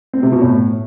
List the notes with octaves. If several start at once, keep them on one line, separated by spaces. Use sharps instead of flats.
C4
C3
B2
A2